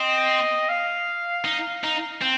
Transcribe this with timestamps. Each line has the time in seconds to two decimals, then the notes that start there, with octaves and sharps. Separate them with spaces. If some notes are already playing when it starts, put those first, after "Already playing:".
Already playing: C4 D#5
0.69 F5
1.45 D#4
1.84 D#4
2.22 C4